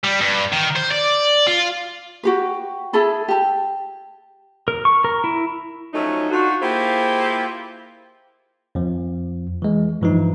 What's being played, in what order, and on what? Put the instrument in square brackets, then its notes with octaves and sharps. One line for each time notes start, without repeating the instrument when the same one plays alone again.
[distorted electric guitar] G3
G2
D#3
C5
D5
F4
[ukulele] F#4 G4 B4
E4 G#4 A4 B5
G4 A5
[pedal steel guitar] A#4
C#6
A#4
E4
[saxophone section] F3 F#3 A3 C#4 D#4
D4 D#4 F4 F#4
A#3 E4 F4 G4 G#4 C5
[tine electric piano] F2 F3
E3 G#3
G2 E3 F3 D#4